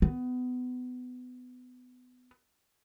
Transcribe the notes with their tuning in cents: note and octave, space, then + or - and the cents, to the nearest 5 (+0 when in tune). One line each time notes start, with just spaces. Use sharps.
B3 +25